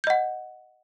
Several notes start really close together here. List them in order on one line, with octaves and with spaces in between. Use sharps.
G6 D#5 F#5